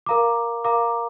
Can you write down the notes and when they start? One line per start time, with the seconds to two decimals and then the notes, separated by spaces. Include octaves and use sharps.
0.06 A#4 F5 A#5 D6
0.64 A#4 F5 A#5 D6